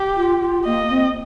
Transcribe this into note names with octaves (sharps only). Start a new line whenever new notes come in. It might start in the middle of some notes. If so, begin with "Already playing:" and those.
Already playing: G4
F4
F4
A#3 D#5
C4